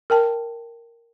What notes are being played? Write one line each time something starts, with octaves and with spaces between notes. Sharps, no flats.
A#4 G5 A5